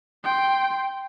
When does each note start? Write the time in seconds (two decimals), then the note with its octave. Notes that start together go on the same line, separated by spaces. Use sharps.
0.24 G5 C6